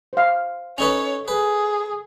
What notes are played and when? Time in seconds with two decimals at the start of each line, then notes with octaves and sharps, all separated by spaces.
0.13 C5 F5
0.78 C#4 D#4 A4 B4 C#5 C#6 F7
1.28 G#4 B4